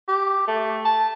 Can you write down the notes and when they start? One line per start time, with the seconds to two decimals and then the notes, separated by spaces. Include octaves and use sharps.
0.08 G4
0.47 A3
0.85 A5